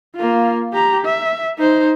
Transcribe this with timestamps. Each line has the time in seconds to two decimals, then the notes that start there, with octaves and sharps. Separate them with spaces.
0.16 A#3 F4
0.73 G4 A#5
1.05 E5
1.58 D#4 C5